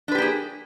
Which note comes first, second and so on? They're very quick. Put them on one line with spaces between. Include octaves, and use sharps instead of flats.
D4 B4 G4 A#3 G#4